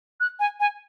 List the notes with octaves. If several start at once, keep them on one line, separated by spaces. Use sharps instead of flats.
F#6
G#5
G#5